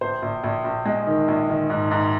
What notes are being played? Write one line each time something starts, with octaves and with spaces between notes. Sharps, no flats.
A#1 C5
A#1
A#1
A#1
G#3
D#3
A#1
D#3
G#2
G#2